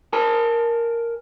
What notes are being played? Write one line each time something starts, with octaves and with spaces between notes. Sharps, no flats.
A#4 G#5 A5